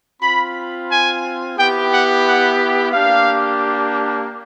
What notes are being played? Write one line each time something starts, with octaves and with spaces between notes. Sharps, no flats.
C4 F4 B5
G#5
B3 E4 G4 G5
F#5
F#5
A#3 D4 G4 F5